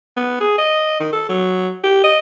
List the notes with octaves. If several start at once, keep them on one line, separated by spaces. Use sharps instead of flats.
B3
G#4
D#5
D#3
A4
F#3
G4
D#5